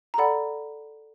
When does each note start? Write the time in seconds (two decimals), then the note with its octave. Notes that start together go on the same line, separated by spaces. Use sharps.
0.14 A#5
0.18 A4 D5 F#5 B5